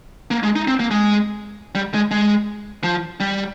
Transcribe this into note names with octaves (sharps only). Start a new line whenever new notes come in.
A#3
G#3
D#4
C4
A#3
G#3
G3
G#3
G#3
F3
G3